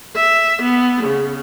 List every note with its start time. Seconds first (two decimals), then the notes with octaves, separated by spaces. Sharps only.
0.16 E5
0.62 B3
1.03 C#3